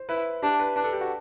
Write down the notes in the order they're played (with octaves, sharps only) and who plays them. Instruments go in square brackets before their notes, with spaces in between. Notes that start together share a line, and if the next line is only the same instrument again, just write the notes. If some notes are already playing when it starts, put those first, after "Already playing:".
Already playing: [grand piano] C5
[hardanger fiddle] E4 [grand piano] B4
[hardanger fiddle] D4 [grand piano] G4
[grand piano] B4
[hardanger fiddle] D4 [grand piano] B4
[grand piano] A4
G4
F#4